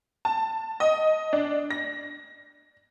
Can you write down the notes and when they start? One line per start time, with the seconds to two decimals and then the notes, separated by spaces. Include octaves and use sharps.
0.25 A5
0.80 D#5
1.33 D4
1.71 A#6